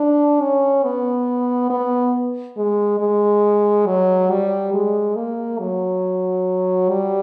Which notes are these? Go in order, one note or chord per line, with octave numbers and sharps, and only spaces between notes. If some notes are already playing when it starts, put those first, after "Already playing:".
Already playing: D4
C#4
B3
B3
G#3
G#3
F#3
G3
G#3
A#3
F#3
G3